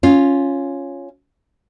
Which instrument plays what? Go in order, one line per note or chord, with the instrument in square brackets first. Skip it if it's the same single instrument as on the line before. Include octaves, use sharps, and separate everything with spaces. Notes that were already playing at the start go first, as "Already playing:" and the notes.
[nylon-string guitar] C#4 F4